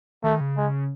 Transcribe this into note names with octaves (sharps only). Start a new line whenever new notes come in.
D#3 A3
C#3
G#3